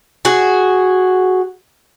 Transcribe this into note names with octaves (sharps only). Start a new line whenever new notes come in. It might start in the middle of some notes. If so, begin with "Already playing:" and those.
F#4 G#4